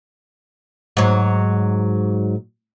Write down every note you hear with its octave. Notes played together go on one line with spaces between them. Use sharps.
G#2 F#3